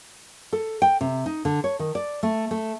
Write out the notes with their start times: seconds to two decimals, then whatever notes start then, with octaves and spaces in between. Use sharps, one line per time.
0.53 A4
0.82 G5
1.01 C3
1.26 D#4
1.45 D3
1.64 C#5
1.79 D#3
1.95 D5
2.23 A3
2.51 A3